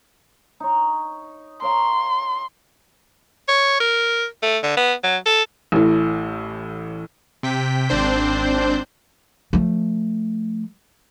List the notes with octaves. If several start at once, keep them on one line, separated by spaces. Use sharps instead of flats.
D#4 C#5
A#4 C#5 F5 C6
C#5
A#4
A3
D3
B3
F#3
A4
A1 A2
C3 G5 B6
G#1 C4 D4 C5 G6
F3 A3